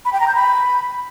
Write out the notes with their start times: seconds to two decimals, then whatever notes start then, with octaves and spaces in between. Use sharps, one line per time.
0.05 B5
0.13 G5
0.20 A#5
0.28 G6
0.35 B5